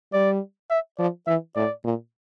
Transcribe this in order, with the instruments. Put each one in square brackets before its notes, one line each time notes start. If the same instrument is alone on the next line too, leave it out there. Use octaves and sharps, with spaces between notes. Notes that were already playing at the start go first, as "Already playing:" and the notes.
[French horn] G3 [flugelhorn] D5
[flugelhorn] E5
[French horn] F3 [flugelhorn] D5
[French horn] E3 [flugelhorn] E5
[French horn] A2 [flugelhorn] D5
[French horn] A#2